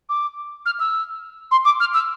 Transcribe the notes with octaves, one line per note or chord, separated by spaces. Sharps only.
D6
F6
E6
C6
D6
F6
E6